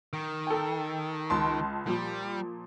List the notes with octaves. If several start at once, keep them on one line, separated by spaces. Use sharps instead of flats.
D#3
A4 G5
C#2 A5 C6
A#2 F3 G3